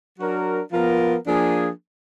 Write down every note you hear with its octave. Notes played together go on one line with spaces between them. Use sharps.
F#3 D4 F#4 A#4
F3 B3 F4 A#4
F3 A#3 D4 G#4